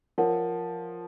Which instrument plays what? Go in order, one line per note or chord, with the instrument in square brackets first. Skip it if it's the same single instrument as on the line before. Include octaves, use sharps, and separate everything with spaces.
[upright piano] F3 [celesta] A#4 C#5 F#5